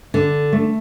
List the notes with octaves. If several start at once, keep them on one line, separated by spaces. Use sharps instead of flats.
D3
A3